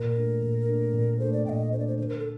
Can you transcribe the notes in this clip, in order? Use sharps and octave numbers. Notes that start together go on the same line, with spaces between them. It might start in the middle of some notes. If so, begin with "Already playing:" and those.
Already playing: A#2 A#4
A3 D4
A#2
A3 D4
A#2
A3 D4 C5
D5
A#2 D#5 G5
A3 D4 C5 D5
C5
D3 C5
A#4
A4